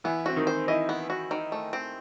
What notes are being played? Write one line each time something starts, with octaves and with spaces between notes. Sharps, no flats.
E3 B3 E4
C4 F#4
D#3 D#4
C5
E3 E4 D#5
B3
F#4
D#3
A3
C4